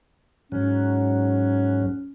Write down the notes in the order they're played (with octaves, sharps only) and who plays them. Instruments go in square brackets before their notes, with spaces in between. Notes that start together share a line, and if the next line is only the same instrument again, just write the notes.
[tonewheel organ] G#2 F#3 [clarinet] C#4